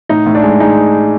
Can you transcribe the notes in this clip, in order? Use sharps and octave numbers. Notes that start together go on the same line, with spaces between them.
A2 D#4
A2
D4
G#3
G#3 D#4